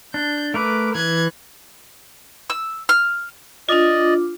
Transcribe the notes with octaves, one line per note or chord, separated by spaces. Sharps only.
D4 G6
A3 A#4 B4 D6
E3 F#6 G#6
E6
F6
D4 F4 D5 D#5